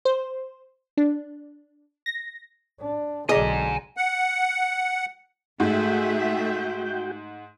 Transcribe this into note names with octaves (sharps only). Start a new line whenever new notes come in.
C5
D4
A#6
D4
B1 D3 G#4 D#5 G#5 A#5 D6
F#5
G#2 A3 F#4 G#4 E5 G5